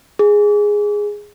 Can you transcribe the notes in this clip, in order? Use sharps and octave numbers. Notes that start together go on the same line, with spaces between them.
G#4